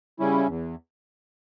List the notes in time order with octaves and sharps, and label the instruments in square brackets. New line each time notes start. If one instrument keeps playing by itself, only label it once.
[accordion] C#3 G3 C#4 E4
E2